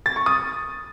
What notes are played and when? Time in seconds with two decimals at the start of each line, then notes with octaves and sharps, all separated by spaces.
0.06 A6
0.16 C#6
0.26 D#6